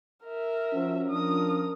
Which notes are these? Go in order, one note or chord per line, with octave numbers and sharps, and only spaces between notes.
A#4 E5
F3 C#4 F#4 C5
F3 D4 A#4 D#6